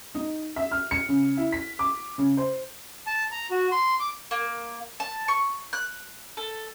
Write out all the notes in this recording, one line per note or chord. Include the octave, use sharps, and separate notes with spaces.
D#4
E5
F6
C#7
C#3
E4
B6
D6
C#3
C5
A5
A#5
F#4
C6
D6
A#3
A5
C#6
F#6
A4